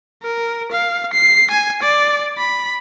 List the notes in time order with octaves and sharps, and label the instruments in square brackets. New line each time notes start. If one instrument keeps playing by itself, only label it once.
[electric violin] A#4
F5
C7
G#5
D5
B5